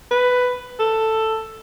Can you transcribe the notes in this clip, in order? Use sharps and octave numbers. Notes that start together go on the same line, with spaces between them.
B4
A4